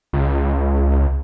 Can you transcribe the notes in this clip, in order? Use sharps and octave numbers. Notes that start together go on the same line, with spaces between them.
C#2